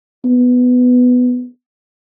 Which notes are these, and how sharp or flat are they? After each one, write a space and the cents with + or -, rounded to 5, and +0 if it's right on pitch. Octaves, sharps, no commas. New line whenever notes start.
B3 +10